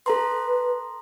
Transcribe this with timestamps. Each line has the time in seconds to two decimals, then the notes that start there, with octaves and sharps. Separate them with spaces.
0.06 A4 B4 A#5 C6